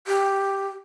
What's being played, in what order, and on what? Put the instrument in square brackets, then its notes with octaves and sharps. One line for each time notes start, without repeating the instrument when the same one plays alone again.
[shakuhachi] G4